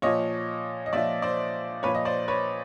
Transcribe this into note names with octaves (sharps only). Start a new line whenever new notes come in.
A#2 F3 C#5 D#5
D#5
A#2 F3 D5 E5
C5 D5
A#2 F3 B4 C#5
D#5
C5 D5
B4 C#5